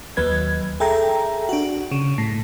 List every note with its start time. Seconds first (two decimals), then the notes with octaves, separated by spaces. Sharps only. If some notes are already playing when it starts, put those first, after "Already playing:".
0.17 D#2 F#3 B4 G#6
0.80 G#4 A4 E5 G5 A#5
1.49 D4 F#4
1.92 C#3
2.18 A2